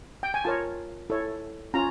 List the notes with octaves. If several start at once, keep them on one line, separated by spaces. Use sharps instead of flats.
G5
G#5
F4 A#4 C#5 A5
E4 A4 C#5
C#4 F4 A#5